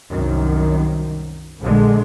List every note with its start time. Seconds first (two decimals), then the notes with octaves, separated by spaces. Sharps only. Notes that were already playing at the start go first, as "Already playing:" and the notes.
0.11 C2 F#2 D#3
1.61 A#1 D3 G#3